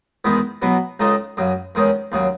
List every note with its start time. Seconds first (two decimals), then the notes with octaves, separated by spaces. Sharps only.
0.25 E2 D#3 G#3 B3 E4
0.62 B2 F#3 B3 E4
1.00 C#2 C#3 G#3 D#4 A4
1.37 F#2 C#3 F#3
1.75 E2 D#3 G#3 C#4
2.12 D#2 C#3 F#3